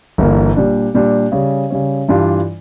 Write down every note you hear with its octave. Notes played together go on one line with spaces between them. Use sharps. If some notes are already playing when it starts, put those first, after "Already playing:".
G1 G2 E3 A#3
A#2 G3 D4
A#2 G3 D4
C#3 G3 C#4
C#3 G3 C#4
G2 E3 G3 D4 F4